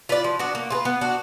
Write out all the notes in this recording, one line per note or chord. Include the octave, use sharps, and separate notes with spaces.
F4 B4 D5
F3
B3 D4 F#4
A#3
F4 G#4 B4
B3
D4 F#4